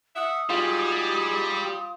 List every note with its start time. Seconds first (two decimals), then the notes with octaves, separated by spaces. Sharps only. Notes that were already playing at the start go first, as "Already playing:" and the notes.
0.16 E5 F#5 D#6
0.49 G3 D#4 F4 F#4 G#4